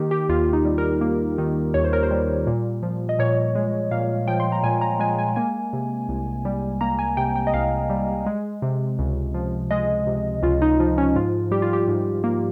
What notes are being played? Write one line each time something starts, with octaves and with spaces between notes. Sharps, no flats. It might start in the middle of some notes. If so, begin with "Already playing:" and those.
Already playing: D#3 A#3 G4
G4
D#2 F4
F4
D#4
G3
A#4
A#3
D#3
D#2 C#5
C5
A#4
C5
G3
A#2
F3
D#5
A#2 C#5
G#3
A#2 F5
F3 G5
C6
A#5
A#2 G#5
A#5
G#3 G#5
G#5
A#3 G#5
C3
C2
G3
A#3 A#5
G#5
C3 G5
G5
D#5
C2 F5
G3
G#3
C3
C#2
F3
G#3 D#5
C3
C#2 F4
D#4
F3 D#4
C#4
G#2 F4
G3 G4
F4
G4
G#2
A#3